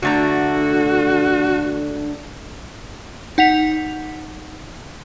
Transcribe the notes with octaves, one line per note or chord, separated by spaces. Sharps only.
D3 A3 D4 F#4 A#5
D#4 F#5 B6 F7